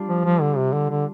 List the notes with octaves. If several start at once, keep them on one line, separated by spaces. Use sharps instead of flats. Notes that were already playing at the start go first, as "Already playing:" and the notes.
Already playing: G3 D4 F4
F3
F3
D3
C3
D3
D3